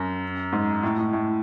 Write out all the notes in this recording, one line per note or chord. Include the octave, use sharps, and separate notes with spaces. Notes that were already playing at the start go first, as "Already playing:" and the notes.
Already playing: F#2
G#2
A2
A2
A2